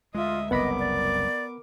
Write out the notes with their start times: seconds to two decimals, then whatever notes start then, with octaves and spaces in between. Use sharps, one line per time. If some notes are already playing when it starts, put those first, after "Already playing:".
0.15 D2 G#3 F4 D#5 E5
0.51 F#1 C2 B3 A#4 D#5 F#5 B5 D6
0.79 D5